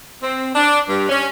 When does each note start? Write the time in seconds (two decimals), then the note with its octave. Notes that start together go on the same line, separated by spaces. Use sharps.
0.22 C4
0.54 D4
0.88 G2
1.09 C#4